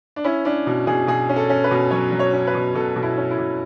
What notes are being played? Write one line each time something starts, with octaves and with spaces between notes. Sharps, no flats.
D4
C#4 E4
C#4 D4
B2
B2 G#4
B2 G#4
C#4
A4
C#4
B4
B2
F#3 C#5
F#3
C#5
C#4
B4
B2
B2 A4
B2
E4
C#4
E4
B2